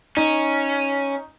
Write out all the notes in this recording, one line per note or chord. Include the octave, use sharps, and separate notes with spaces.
C#4 D#4